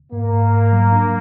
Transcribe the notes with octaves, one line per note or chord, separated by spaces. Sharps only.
G#2 A#3
G#2
G#2
F#3
D4